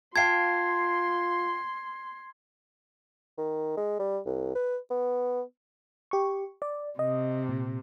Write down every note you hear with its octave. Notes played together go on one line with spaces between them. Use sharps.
F4 F5 G5 A5 C6 G#6 C7
D#3
G#3
G3
C2
B4
B3
G4 C#6
D5
C3 D#5
A#2